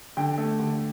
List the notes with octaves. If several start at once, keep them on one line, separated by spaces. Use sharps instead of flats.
D3 G5
A3
D3